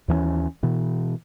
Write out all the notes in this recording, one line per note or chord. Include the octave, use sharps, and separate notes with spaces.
D#2 E3 F#3 C#4
B2 E3